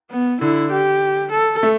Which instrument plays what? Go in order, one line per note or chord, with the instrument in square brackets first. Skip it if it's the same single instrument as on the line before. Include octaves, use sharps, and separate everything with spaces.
[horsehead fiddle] B3
[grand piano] D3 [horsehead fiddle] E4
[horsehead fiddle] G4
A4
[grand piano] A3